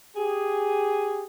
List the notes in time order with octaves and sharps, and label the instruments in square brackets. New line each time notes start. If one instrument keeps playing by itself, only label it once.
[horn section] G4 G#4